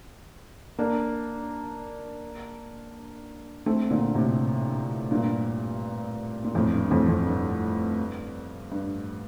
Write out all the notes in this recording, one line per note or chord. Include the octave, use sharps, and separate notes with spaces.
A#3 D4
A3 C4
A#2 D3
A2 C3
G2 A#2
A#2
F2 A2
G2
F2 A2
F2
G2
G2